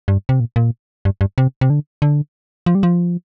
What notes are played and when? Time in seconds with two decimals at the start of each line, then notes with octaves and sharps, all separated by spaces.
0.08 G2
0.29 C3
0.40 A#2
0.56 A#2
1.05 G2
1.21 G2
1.38 C3
1.61 C3
1.70 D3
2.02 D3
2.66 F3
2.75 G3
2.83 F3